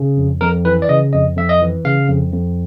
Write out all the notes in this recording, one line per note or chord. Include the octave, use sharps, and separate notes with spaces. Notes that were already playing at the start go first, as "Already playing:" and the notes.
Already playing: C#3
F2
F2 A#4
E3 B4
D5
C#3 D#5
F2 D#5
F2 E5
D#5
E3
C#3 F5
F2
F2